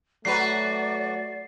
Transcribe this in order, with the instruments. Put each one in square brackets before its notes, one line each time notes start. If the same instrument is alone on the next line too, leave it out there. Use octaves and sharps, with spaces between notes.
[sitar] F#3 F#4 B4 [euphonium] A3 [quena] D5 [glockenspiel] C7